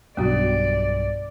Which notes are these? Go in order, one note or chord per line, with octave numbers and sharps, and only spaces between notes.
B1 G2 B3 F#4 D5